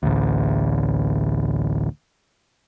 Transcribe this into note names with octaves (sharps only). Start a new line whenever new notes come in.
A1 D2